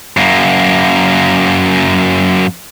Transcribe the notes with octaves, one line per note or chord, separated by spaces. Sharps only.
F#2 A#3